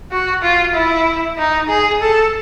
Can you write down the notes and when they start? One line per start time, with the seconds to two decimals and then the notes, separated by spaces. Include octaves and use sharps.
0.12 F#4
0.43 F4
0.74 E4
1.38 D#4
1.69 G#4
2.01 A4